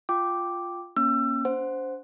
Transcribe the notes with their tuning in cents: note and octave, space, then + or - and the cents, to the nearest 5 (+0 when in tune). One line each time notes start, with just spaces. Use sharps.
F4 +0 G5 +0 D6 +0
A#3 +30 C#4 +0 E6 +30
D4 -45 C5 -5 F#5 -10